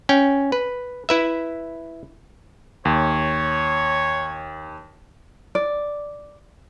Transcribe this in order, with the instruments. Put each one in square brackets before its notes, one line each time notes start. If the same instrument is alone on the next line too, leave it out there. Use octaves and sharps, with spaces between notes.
[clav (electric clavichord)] C#4 G5
B4
E4 B4 E5
[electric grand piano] D#2 [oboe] C#5
[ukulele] D5